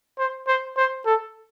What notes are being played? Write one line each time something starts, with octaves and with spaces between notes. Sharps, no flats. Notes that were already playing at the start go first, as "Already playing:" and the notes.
C5
C5
C5
A4